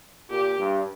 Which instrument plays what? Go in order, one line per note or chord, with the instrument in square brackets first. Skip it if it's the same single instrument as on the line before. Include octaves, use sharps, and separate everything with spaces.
[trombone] A#2 [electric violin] G4
[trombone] G2